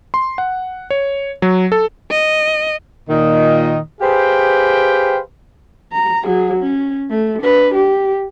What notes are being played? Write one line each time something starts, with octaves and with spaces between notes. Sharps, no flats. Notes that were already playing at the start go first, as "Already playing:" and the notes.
C6
F#5
C#5
F#3
A4
D#5
A#2 D#3 D#5
G4 G#4 B4 C5 F5 G5
A#5
F#3 G#4
C#4
A3
D4 B4
G4